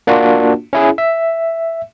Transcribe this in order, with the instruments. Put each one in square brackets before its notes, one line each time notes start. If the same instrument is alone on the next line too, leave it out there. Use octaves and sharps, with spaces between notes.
[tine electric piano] A#3 D4 F4 F#4
C#4 E4 G#4
E5